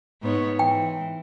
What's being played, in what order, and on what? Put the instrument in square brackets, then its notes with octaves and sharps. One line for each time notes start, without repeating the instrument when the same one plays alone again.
[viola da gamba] G#2 B3 C#5
[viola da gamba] G#2 E3 [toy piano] G5